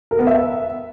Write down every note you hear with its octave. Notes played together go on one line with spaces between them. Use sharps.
A#4
B3
E5